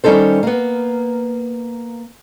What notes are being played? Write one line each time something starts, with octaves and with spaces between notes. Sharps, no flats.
D#3 G3 C#4 D#4 A4 C5
A#3 B3